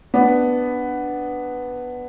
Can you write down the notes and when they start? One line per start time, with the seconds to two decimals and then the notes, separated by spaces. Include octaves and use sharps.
0.14 B3 D4